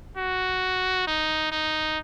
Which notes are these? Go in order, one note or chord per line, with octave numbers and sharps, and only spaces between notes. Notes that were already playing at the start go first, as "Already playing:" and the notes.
F#4
D#4
D#4